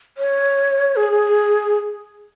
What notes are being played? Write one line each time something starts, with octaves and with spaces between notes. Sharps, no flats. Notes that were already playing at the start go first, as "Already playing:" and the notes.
C#5
G#4